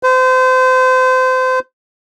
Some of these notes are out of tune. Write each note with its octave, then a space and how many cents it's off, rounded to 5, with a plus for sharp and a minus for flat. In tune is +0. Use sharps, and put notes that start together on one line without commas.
C5 -30